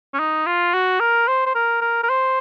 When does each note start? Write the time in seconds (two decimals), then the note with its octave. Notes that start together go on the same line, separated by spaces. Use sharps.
0.14 C#4
0.20 D#4
0.47 F4
0.74 F#4
1.00 A#4
1.28 C5
1.46 C5
1.55 A#4
1.82 A#4
2.04 A#4
2.09 C5